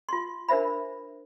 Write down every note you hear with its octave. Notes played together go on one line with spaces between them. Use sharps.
F4 C6
D4 A#4 C5 E5 B5